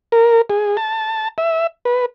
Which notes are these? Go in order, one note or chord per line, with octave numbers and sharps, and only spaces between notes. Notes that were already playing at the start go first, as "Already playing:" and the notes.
A#4
G#4
A5
E5
B4